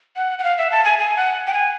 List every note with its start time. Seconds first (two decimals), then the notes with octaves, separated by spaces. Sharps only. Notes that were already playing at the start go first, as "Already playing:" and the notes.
0.16 F#5
0.39 F#5
0.44 F5
0.58 E5
0.71 A5
0.85 G#5
0.99 G#5
1.17 F#5
1.47 G5
1.54 G#5